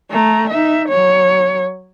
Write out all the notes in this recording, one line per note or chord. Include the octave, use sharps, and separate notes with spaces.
A3 A#5
D#4 E5
F#3 C#5